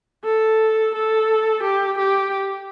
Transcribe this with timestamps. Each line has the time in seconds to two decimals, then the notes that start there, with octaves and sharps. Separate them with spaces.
0.25 A4
0.95 A4
1.63 G4
1.98 G4